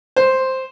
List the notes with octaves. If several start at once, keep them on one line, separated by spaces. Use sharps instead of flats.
C5